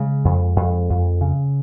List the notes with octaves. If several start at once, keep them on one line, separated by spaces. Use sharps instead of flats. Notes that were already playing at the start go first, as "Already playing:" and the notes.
Already playing: C#3 G#3
F2
F2
F2
C#3